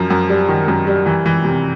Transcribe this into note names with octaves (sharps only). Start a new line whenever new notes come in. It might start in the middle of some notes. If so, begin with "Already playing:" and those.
Already playing: F#2 F3
F#2
G3
D#3
F#2
G3
E3
E3
C3